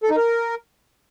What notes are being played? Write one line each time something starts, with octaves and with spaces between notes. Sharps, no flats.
A4
D#4
A#4